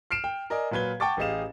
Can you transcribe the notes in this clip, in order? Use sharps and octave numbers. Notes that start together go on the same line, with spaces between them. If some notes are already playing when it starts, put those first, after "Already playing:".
F6 C7 D7 E7
G5
A#4 D5 D#5 G#5
A#2 F#3 B4 G#6 G7
F#5 G5 A5 C#6 D6 A6
A1 G4 G#4 D#5 F5 E7